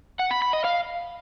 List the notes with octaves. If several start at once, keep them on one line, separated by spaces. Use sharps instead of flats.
F#5
B5
B5
D#5
F5